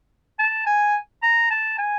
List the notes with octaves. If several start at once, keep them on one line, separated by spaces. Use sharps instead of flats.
A5
G#5
A#5
A5
G#5